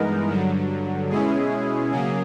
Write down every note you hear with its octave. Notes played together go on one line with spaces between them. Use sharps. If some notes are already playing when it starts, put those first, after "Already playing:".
Already playing: G2 E3 G#3 B3 D#4 A#4
G2 D3 F#3
B2 G#3 C#4 E4 G#4
C#3 F#3 A#3 G#4